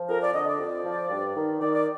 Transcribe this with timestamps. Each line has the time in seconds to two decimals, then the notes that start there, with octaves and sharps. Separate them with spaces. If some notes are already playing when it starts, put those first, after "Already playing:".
Already playing: F3
0.08 F2 A#4
0.21 D5
0.34 D3 D#5
0.47 D5
0.59 F2
0.84 F3
1.10 G2
1.36 D#3
1.61 D#3 D5
1.73 D5